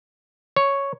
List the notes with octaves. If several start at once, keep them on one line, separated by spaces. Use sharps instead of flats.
C#5